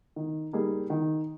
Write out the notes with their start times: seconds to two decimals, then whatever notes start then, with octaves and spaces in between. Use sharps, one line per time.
0.16 D#3
0.53 G3 A#3 D#4 G#4
0.90 D#3